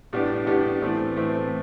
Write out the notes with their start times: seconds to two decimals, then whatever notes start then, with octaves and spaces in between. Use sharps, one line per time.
0.13 A2 G3 B3 D4 G4
0.46 A2 G3 B3 D4 G4
0.82 A2 E3 A3 C4
1.16 A2 E3 A3 C4